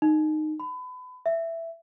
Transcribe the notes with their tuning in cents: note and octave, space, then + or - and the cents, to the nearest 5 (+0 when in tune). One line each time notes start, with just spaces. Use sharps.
D#4 -15
B5 +30
E5 +10